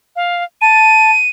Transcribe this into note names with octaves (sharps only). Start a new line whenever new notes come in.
F5
A5 D#7